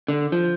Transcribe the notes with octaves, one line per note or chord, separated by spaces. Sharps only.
D3
F3